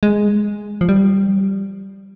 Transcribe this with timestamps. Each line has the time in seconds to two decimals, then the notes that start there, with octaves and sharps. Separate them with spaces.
0.03 G#3
0.81 F3
0.89 G3